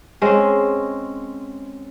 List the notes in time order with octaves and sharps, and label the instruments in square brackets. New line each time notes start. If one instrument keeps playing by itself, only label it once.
[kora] G#3 C4 C#4